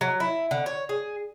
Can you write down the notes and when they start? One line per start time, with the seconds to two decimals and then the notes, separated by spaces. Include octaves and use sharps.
0.01 F#3
0.20 E4
0.51 D3
0.66 C#5
0.89 G#4